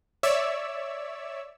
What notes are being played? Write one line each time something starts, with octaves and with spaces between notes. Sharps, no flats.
C#5 D5 E5 E6